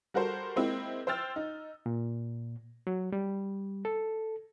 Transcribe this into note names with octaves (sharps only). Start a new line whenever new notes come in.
G3 F#4 A4 A#4 C5
G#3 A#3 C4 E4
C5 G5 E6 F6 A6
D#4
A#2
F#3
G3
A4